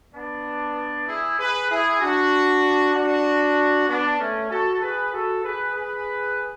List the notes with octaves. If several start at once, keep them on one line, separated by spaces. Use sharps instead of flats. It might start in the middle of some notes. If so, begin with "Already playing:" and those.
B3 D4
E4 G#4
G#4 B4
E4 G#4
D4 F#4
D4 F#4
B3 D4
A3 C#4
F#4 A4
G#4 B4
F#4 A4
G#4 B4
G#4 B4